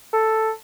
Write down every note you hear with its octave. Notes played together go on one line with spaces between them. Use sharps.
A4